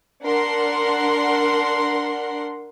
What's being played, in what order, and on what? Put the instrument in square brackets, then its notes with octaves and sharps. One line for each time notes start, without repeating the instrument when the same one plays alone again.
[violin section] D4 A#4 F#5 C6